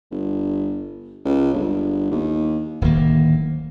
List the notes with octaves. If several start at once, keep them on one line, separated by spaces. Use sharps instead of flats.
G1
C#2
G1
D#2
D1 D2 D#3 A#3